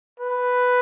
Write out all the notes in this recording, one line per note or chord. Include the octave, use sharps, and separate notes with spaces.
B4